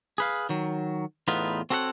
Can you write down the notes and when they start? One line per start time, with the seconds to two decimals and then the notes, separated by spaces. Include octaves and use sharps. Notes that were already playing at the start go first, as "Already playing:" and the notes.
0.18 G#4 B4 F5
0.49 D#3 F#3
1.28 E2 A2 B3 D#4 F4 B4
1.70 C4 F#4 A4 C#5 E5 F#5